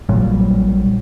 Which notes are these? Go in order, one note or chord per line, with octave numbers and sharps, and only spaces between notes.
A#1 A#2 F#3 G3